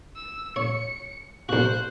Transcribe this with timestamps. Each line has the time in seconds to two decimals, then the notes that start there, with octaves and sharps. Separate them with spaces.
0.16 E6
0.56 C#5 C#7
1.49 B1 F#4 C5 F#6